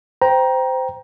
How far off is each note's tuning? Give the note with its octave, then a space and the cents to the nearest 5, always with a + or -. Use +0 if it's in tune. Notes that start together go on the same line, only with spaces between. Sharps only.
C5 -20 G5 +0 A#5 +20